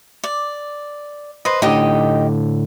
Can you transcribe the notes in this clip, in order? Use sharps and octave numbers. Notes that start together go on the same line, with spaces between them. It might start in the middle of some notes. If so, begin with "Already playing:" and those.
D5
B4 C5 D#5
A2 D3 D#4 G4 D#5